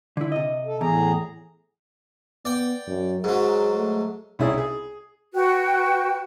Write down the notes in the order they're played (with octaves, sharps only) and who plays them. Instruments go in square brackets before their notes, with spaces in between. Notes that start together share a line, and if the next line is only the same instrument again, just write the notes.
[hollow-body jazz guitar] D3 E4
C3 D#5
[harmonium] A4
[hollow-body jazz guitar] E2 [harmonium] A2 G#4 A#5
[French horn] B3 [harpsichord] D5 G5
[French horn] F#2
[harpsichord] G#2 F#3 [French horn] G#4
[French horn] A3
[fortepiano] C2 C#4 E4 G#4
G#4
[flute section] F#4 B4 G5 F#6